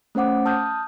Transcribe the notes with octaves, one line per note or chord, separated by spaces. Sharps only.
A3 C#4 C5 F#5 D6
A5 D#6 F6 G6